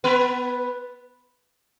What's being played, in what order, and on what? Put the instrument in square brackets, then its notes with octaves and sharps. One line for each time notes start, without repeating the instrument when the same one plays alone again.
[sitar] B3 B4